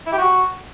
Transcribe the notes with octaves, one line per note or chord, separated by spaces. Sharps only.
E4
G4
F#4